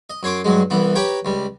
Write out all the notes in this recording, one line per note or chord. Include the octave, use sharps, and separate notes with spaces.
D#5
F#2 C#5 C6 D6
G2 F#3 G#3
C2 E3 B3
G4 B4 C#5 G5 A#5
C#2 G3